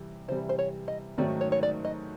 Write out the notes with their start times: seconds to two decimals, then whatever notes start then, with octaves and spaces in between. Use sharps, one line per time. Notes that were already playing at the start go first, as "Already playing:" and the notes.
Already playing: C3 E3 G3
0.28 C3 E3 G3 C5
0.49 C5
0.59 C#5
0.88 D#5
1.18 G#2 D#3 F#3 A3 C#4 D5
1.41 C#5
1.52 C#5
1.63 D5
1.85 D#5